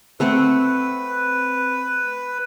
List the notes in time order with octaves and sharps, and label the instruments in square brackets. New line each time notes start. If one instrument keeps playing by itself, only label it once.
[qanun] A3 C4 F#5 [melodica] B4